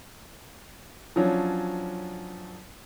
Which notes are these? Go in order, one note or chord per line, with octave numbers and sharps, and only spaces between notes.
F3 F#3 C#4 D4